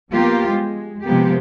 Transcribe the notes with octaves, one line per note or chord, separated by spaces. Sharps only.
F3 A#3 B3 F4 G4
G#3
C3 F3 G#3 A#3 B3 G4